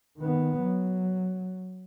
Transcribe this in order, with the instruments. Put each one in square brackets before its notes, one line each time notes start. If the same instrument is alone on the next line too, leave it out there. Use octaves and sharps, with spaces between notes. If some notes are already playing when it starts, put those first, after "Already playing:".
[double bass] D#3 B3
F#3